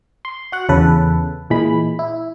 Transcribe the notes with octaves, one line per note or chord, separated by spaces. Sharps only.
C6
F#4 F#5
E2 C#3 A4 B4
A#2 E3 G#3 B5
E4